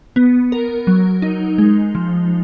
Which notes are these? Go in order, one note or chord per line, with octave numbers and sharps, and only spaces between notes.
B3
A#4
F#3
D#4
G#3
F3